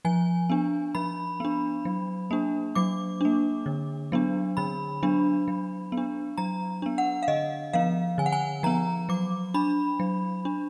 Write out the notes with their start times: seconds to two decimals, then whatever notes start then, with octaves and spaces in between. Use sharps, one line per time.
0.05 F3 G#5
0.50 B3 D4
0.95 F3 B5
1.40 B3 D4
1.85 F#3
2.31 A#3 D4
2.75 F#3 D6
3.21 A#3 D4
3.66 D3
4.12 F#3 B3 D4
4.57 D3 B5
5.03 F#3 B3 D4
5.48 F#3
5.92 B3
5.97 D4
6.38 F#3 A#5
6.82 B3 D4
6.98 F#5
7.23 F5
7.28 D3 D#5
7.73 F3 B3 F5
8.18 D3 G#5
8.26 F#5
8.32 G#5
8.63 F3 B3 A#5
9.09 F#3 D6
9.54 D4 B5
10.00 F#3
10.45 D4